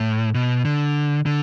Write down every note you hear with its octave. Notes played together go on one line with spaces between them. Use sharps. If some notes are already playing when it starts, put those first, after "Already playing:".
Already playing: A2
B2
D3
D3